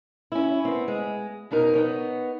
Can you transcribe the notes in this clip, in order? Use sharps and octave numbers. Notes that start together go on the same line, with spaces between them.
C#4 E4
B3 C4
G#3
F2 B2 D#4 A#4
B3 D#4 C#5